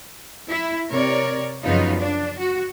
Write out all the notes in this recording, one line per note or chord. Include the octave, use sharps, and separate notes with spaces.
E4
C3 A#4 C#5 D5
F#2 C#3 F3 B3 D#4 F4
D4
F#4